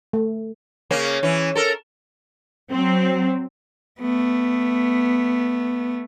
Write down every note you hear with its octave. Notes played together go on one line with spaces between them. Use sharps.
A3
C#3 A#3 C#4
E3 C#4
A4 A#4
F#3 C4
A3 B3